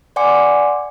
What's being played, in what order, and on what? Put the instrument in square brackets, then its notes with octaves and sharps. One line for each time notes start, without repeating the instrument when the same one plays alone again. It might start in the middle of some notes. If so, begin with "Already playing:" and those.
[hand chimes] D5 F#5 G#5 C6 D6 C#7